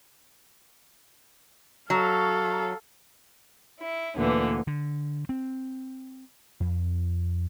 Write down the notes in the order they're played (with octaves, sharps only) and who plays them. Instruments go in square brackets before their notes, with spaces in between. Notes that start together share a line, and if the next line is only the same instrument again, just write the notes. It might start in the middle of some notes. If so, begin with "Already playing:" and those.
[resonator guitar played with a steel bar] F#3 [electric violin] A4 F5
[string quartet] E4
D2 A#2 D3 E3 B3
[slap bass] D3
C4
F2